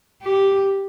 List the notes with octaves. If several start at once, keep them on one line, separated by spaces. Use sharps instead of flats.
G4